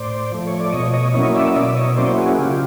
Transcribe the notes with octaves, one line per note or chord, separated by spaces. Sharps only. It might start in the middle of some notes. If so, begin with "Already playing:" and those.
Already playing: A2 C5 D5
F3 A3
C#5
D5
B2 C#5 D#5
C#5 D#5
F#3 A#3 C#4 E4 C#5 D#5
D5 E5
D#5
B2 D5 E5
C#5 D#5
F#3 A#3 C#4 E4 C5 D5
F#4 G#4
C#3 F4 G4